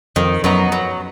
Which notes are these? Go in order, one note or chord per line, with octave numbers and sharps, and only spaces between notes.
F2 D#3
F#2 F#3 B3 D#4
F#3